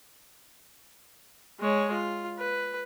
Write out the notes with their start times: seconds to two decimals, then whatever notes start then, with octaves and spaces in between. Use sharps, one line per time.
1.60 G#3 C#5
1.92 F4
2.39 B4